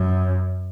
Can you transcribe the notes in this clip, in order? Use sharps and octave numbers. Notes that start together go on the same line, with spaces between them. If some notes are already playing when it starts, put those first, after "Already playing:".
Already playing: F#2